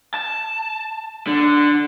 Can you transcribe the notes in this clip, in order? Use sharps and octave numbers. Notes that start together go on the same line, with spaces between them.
A5
D3